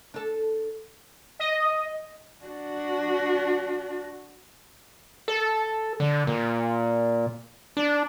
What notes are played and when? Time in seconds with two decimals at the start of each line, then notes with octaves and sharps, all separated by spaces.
0.14 D4 A4
1.39 D#5
2.46 D4 F#4
5.28 A4
6.00 D3
6.27 A#2
7.77 D4